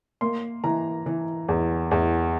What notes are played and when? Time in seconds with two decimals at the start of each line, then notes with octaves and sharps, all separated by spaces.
0.21 A#3 C6
0.64 E3 A#5
1.06 E3
1.48 E2
1.91 E2